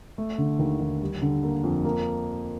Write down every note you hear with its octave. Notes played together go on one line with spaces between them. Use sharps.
A3
D3
D#2
D#2
G3
D3
A#3
F2
A#3